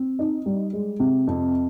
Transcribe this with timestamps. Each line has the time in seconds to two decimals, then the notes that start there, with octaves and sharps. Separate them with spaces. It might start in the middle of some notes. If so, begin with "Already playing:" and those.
Already playing: C4
0.19 D#4
0.46 G3
0.73 G#3
1.00 C3
1.27 F2